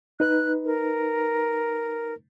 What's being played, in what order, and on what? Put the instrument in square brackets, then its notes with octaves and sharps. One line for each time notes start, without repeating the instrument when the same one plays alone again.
[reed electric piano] D#4 B4 [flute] F#6
[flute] A#4